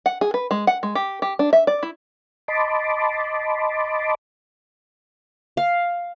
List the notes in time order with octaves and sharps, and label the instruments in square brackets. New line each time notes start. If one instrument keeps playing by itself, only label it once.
[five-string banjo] F#5
G#4
B4
G#3
F#5
G#3
G4
G4
D4
E5
D5
E4
[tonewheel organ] D#5 A5 B5 C6 D6
[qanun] F5